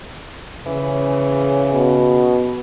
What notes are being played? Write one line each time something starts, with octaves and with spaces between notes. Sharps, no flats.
C#3 E3
B2